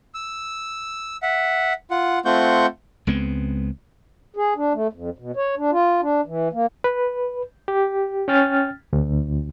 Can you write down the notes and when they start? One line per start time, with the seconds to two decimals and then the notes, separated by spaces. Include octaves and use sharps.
0.14 E6
1.23 E5 F#5
1.91 F4 F#5
2.25 A3 C4 F4 F#5 C#6 G6
3.07 C#2 G#3 B3 C4
4.36 G#4
4.56 D4
4.73 A3
4.93 F2
5.19 B2
5.36 C#5
5.57 D4
5.72 F4
6.02 D4
6.26 E3
6.53 A#3
6.84 B4
7.68 G4
8.28 C#4 G5 F6 A6
8.93 D2